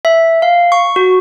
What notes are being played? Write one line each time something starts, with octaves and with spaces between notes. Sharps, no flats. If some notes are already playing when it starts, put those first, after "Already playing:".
E5
F5
C#6
F#4